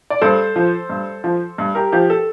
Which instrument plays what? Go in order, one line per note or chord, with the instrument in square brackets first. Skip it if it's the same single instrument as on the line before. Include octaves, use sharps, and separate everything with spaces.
[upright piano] D5
G2 A4 C5
F3
G2
F3
G2
G4 A#4
F3 G4
A4